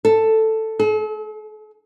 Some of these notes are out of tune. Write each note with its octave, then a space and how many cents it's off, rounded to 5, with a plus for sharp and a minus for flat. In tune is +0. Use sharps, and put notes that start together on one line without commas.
A4 +5
A4 -45